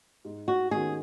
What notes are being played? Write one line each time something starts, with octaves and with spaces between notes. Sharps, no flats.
G#2
F#4
D#3 G#3 C#4 F#4 G#4